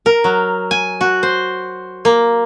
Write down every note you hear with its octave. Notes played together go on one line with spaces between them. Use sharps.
A#4
F#3
G#5
F#4
C5
A#3